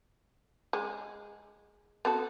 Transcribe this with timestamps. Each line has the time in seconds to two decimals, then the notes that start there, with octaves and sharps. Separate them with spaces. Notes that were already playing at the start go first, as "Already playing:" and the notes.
0.73 G#3
2.05 B3 F#4 A4